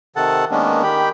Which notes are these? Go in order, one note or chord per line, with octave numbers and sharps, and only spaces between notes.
C3 D#3 A4 F#5 A5
D#3 G#3 A#3 B3 C#4 D4
D#3 G4 G5 B5